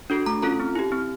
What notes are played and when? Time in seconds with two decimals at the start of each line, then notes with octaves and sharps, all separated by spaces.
0.10 D4 F#4 A4
0.26 A3 A#5
0.42 C#4 F4 A4 A#5
0.60 C4
0.75 E4 G4
0.92 C4